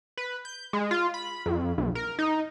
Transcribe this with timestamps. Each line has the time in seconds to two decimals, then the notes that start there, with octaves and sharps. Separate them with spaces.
0.17 B4
0.45 G6
0.73 G#3
0.91 F4
1.14 B5
1.46 F2
1.78 B1
1.95 A#4
2.19 D#4